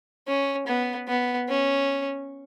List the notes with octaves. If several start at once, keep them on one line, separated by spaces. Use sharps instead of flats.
C#4
B3
B3
C#4